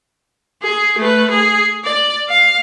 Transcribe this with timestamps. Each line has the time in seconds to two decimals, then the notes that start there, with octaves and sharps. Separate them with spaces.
0.62 G#4
0.98 A3 B4
1.30 G#4
1.84 D5
2.29 F5